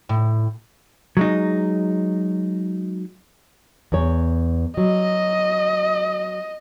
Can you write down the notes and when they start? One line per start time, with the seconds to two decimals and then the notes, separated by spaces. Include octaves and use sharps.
0.09 A2
1.17 F#3 G#3 D#4
3.92 E2 C#5
4.77 F#3 D#5